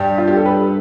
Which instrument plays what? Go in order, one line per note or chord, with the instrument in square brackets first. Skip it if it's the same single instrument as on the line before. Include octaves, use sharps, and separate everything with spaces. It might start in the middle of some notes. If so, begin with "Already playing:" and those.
Already playing: [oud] G2 G3
[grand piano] F4
G4
A4
B4